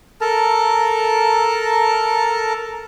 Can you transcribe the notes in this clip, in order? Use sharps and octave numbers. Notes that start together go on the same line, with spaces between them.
A4 A#4 A5 A#5